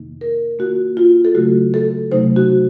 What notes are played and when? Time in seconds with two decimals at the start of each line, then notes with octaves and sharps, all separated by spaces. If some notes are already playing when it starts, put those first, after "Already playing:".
Already playing: F2 C3 D#3 A#3 D#4
0.21 A#4
0.59 D#3 A#3 F4 F#4
0.97 F4
1.25 A4
1.35 C#3 F#3 A3 F#4
1.74 A4
2.12 C3 F#3 A3 D#4 C5
2.36 F#4